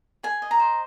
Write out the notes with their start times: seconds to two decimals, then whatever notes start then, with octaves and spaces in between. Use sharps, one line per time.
0.23 G#4 G#5
0.42 D#5
0.51 A#5
0.60 C5